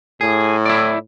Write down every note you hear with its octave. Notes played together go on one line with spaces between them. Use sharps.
A2 G#4
E4 D5